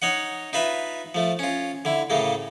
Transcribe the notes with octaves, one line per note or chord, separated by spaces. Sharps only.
D#4 C#5 D#5 F#5
D#4 F4 B4 E5
F3 A3
C#4 F4
D3 E4
A2 C#3 A3 A#3